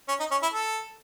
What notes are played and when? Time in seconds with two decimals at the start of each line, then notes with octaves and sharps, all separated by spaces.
0.09 C#4
0.20 D#4
0.31 C#4
0.42 E4
0.54 A4